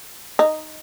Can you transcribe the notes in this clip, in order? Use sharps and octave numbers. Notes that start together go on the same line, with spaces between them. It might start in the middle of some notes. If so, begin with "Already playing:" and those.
D#4